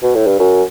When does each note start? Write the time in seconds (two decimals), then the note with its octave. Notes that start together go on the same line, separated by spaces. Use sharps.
0.03 B2
0.15 A2
0.27 G2
0.40 F#2